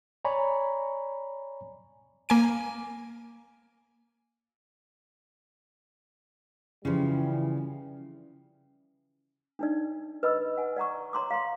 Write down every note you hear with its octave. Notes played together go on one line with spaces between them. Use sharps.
C#5 D5 G#5 A#5 B5 C#6
A#3 G#5 D7
C#3 E3 F3 G3 C#4
D4 D#4 D5
B4 D#5 B5 E6
F#5 G#5
D5 F#5 A#5 C#6
C#5 A#5 C6 D6
F5 A#5 C6